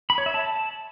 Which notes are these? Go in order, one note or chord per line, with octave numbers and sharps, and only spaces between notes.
B5
C#5
E5
A5